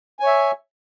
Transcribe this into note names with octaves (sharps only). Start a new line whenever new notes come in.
C#5 E5 G#5